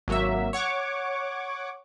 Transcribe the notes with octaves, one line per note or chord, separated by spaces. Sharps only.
G#1 F#3 A#3 F#4 E5
C#5 F#5 C#6 D6